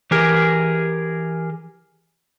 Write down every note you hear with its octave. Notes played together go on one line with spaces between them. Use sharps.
E3 G4 G#4 A#4